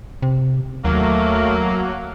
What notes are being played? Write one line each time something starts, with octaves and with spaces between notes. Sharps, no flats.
C3
D#2 F#3 A3 A#3